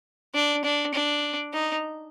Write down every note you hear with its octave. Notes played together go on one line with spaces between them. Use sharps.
D4
D4
D4
D#4